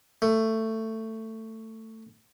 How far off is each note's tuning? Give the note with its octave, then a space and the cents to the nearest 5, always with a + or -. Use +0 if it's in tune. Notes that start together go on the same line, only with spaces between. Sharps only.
A3 +15